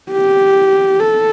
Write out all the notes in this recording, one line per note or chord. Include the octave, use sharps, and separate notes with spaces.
G4
A4